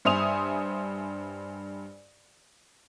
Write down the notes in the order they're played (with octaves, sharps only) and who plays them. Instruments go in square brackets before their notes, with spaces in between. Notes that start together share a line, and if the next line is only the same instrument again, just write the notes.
[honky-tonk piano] G2 C5 E5 G#5 D#6 F7